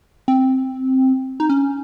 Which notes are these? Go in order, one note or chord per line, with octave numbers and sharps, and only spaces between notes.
C4
D#4
C#4